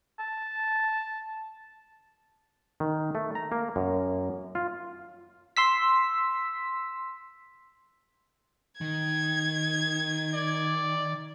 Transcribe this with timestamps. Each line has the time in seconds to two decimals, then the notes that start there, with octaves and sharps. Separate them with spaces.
0.20 A5
2.80 D#3
3.15 A3
3.35 A#5
3.52 A#3
3.76 F#2
4.55 F4
5.57 C6 E6 B6
8.81 D#3 G#6
10.34 D5